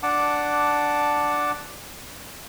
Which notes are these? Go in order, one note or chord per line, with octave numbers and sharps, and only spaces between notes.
D4 F#5 A5 D6